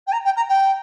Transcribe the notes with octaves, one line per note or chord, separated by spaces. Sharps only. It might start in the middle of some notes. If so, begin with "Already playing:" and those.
G5
A#5
G5
A#5
G5